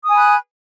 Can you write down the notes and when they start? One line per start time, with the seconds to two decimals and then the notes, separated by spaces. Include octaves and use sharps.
0.04 D#6
0.08 G#5
0.13 B5
0.18 F#6